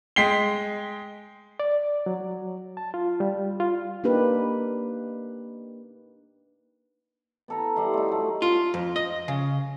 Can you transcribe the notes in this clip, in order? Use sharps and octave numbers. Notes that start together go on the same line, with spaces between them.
G#3 G5 B6 C7 G7
D5
F#3
A5
F4
G3
F4
A#3 D4 D#4 G4 B4
B3 A4 A#5
G3 E5 F#5 C6
A3 D#4
F#3 A3
F4
F2
D#5
C#3